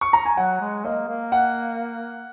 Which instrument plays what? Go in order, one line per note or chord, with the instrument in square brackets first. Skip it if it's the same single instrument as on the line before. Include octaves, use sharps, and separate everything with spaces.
[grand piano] C#6
A#5
G#5
[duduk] F#3 [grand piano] F#5
[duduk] G#3
[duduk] A#3 [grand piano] D#5
[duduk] A#3
[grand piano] F#5